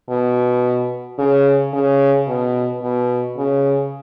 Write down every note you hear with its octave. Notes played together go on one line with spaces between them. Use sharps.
B2
C#3
C#3
B2
B2
C#3